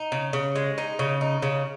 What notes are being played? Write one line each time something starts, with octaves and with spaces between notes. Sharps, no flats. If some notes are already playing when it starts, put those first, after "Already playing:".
Already playing: D#4
C#3
C#3
G#3
D#4
C#3
D#4
C#3